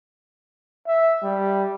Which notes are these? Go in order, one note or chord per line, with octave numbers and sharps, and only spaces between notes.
E5
G3